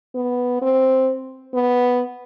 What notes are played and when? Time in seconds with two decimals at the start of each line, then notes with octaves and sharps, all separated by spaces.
0.15 B3
0.62 C4
1.54 B3